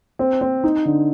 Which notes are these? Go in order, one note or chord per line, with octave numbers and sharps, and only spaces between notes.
C4
C4
D#4
D3